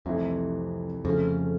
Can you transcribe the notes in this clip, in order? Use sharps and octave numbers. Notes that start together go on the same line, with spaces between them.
C2 F2 C3 E3 A3
F2 C#3 F3 A3 C#4 F4